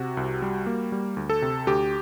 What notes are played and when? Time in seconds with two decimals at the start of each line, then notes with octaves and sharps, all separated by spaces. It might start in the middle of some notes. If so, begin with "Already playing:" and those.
Already playing: C3 F#4
0.17 C2
0.42 G3
0.66 A#3
0.92 G3
1.17 D2
1.30 A4
1.42 C3
1.67 D2 G4